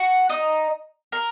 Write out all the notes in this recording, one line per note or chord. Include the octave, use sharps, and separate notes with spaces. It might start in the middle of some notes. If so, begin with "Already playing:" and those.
Already playing: F#4 F#5
D#4 D#5
A#4